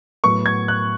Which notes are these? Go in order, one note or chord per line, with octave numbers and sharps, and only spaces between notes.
A2 F#3 B3 C#6
G#6
F#6